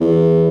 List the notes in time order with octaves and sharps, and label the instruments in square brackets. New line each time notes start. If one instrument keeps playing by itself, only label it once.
[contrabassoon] E2